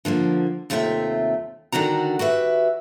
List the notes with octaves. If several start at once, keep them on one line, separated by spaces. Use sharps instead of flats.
D3 F3 G#3 A#3
D#2 C3 A3 F4 E5 G5
D3 D#3 D4 F#4 A#5
F#4 G4 B4 E5